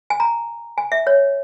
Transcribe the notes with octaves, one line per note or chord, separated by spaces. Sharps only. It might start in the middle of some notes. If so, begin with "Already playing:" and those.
G#5
A#5
G#5
E5
C#5